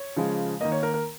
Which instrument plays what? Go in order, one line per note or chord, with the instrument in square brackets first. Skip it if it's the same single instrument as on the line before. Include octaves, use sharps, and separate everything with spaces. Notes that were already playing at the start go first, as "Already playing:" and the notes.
Already playing: [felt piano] C#5
C#3 F3 G#3
D#3 A#3 D#5
C#5
A#4
A#4